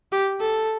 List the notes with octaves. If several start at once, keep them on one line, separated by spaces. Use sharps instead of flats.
G4
A4